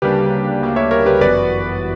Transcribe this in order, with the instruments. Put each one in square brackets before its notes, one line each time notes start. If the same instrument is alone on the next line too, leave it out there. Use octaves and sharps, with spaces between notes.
[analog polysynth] D2 C#3 G3 A#3 D4 [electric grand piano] G4 B4
[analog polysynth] D2 C#3 G3 A#3 D4
[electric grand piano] C#5 E5
A#4 C#5
G4 B4
[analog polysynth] G1 F#2 E3 B3 F#4 [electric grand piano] B4 D5